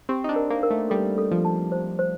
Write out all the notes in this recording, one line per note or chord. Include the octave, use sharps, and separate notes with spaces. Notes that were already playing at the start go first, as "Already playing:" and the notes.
C4 G4
D#4
D4
A#4
A#3
A#4
A3
G3 A4
A4
F3
A5
C5
C5